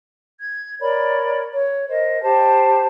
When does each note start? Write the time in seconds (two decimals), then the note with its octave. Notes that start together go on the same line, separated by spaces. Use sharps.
0.42 G#6
0.80 A#4 C#5 D5 B5
1.53 C#5
1.89 A#4 C5 D#5
2.22 G4 C5 A5